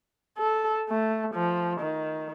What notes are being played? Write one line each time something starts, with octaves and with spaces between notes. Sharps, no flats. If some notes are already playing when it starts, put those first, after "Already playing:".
A4
A3
F3
D#3